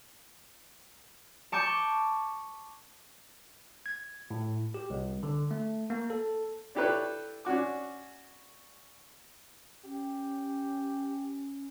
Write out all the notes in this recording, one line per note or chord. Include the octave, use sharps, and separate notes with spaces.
A5 C#6 D6 G6
G#6
A2
G4
C2
D3
A3
A#3
A4
D4 E4 G4 A4 B4 C#5
C#4 D4 F#4 D6
C#4 G4